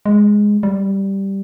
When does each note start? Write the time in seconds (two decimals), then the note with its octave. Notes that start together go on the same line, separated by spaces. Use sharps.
0.06 G#3
0.63 G3